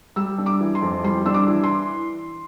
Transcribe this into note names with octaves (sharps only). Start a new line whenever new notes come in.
G3 E6
D4
D6
E3
C6
F2
G3 C6
D4 E6
D6
E3
C6